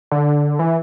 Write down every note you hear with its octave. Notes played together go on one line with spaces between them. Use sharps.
D3
E3